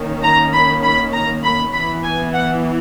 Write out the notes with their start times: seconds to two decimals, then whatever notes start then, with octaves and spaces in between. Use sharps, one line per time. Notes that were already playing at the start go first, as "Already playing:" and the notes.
Already playing: D#3 A#3 C#4
0.23 A#5
0.53 B5
0.83 B5
1.13 A#5
1.44 B5
1.73 E3 B3 B5
2.04 G#5
2.34 F#5